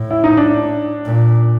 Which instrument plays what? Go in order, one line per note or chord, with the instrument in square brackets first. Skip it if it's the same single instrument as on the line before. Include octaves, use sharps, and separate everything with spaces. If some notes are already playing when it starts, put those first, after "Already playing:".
Already playing: [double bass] A2
[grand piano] E4
D#4
D4
[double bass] A#2